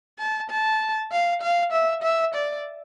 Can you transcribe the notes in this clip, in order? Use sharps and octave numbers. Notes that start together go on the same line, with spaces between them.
A5
A5
F5
F5
E5
E5
D5